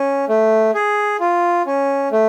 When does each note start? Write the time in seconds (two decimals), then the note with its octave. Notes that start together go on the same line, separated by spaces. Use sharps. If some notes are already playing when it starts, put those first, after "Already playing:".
Already playing: C#4
0.29 A3
0.74 G#4
1.20 F4
1.66 C#4
2.12 A3